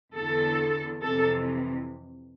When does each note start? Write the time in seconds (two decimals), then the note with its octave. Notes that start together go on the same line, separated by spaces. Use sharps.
0.15 E2 D3 A4
1.03 F2 C3 E3 A4